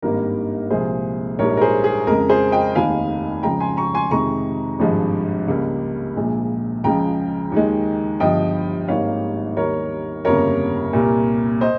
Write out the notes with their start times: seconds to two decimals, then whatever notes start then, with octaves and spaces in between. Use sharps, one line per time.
0.02 G#1 G2 D#3 G3 A#3 A#4
0.70 C2 A#2 F3 G#3 G#4 C5
1.39 A#1 G#2 G3 A#4 C#5
1.57 A#4
1.61 G#4 C5
1.84 G#4
2.07 F2 C#3 G#3 A#4
2.29 G#4 C5
2.52 D#5 G5
2.75 F1 D#2 D#3 F5 G#5
3.43 C#2 C#3 F3 G#3 G5 A#5
3.60 G#5 C6
3.77 A#5 C#6
3.94 G#5 C6
4.11 F2 C3 D#3 G#3 A#5 C#6
4.79 G#1 G2 F3 G#3
5.48 C#2 C#3 G3 A#3
6.16 A#1 A#2 F3 G#3
6.84 C#2 C#3 F3 G#3 G5 A#5
7.52 D#2 D#3 G#3
8.20 G1 G2 F3 D#5 G5
8.88 G#1 G#2 D#3 G3 A#3 C#5 F5
9.57 D#2 D#3 G3 A#4 C#5
10.25 G1 F2 C#3 G3 A#3 A#4 C#5
10.93 C2 A#2 G3 A#3
11.61 C5 D#5